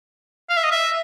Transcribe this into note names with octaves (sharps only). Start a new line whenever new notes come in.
F5
E5
D#5
E5